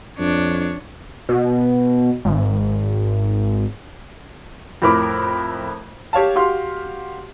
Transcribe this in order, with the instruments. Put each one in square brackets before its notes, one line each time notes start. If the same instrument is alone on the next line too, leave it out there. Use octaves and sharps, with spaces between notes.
[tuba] F2 [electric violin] D4 C#5
[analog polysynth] B2
G#1
[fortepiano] F2 A2 E4 A#4 B5 D6
G4 C#5 F5 A5
F#4 G4 F5 C6 F6